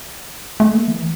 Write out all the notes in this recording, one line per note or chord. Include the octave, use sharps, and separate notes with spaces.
A3
A#3
E3